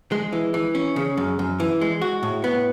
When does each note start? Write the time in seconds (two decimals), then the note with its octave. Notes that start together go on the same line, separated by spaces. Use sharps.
0.12 G#3
0.33 E3
0.54 E3
0.75 C#4
0.96 C#3
1.17 F#2
1.39 F#2
1.60 E3
1.81 G#3
2.01 F#4
2.23 A2
2.44 B3